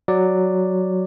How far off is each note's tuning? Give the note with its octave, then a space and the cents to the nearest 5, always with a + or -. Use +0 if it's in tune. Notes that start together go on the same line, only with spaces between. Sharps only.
F#3 +0 D5 +0